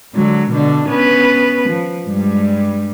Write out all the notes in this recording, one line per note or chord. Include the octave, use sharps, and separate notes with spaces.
D3 F#3 G#3
B2 D3 D4
B3 C#4 B4
F3
G2 G3 G#3